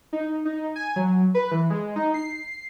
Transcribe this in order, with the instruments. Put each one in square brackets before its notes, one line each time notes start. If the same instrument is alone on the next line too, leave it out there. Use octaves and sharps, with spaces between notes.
[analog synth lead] D#4
D#4
G#5
F#3
B4
E3
G#3
D#4
C7